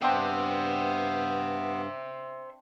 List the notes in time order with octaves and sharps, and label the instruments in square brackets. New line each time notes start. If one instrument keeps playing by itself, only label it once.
[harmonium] G2 F5 [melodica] B3 [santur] C4 D4 G5 [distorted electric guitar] C5 E5